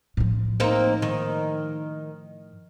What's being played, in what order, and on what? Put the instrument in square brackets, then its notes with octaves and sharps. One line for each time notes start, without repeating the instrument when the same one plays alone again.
[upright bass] A2 F3
[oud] A#3 C4 D#4
D#3